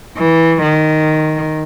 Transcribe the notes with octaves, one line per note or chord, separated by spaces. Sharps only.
E3
D#3